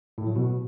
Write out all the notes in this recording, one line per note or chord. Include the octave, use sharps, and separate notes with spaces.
A2
F#3
B2